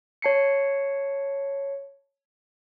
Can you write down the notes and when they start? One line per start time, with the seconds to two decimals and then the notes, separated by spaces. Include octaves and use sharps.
0.22 C#5 A5 C7 C#7